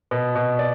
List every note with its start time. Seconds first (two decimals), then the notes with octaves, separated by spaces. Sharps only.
0.11 B2
0.35 B2
0.59 D5